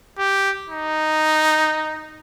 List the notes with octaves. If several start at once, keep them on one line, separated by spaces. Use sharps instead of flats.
G4
D#4